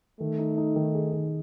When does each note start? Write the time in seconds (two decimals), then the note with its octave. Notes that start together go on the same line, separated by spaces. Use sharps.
0.20 D#3 A3
0.38 D#4
0.58 D#4
0.76 D#3
0.95 G#4
1.13 D#3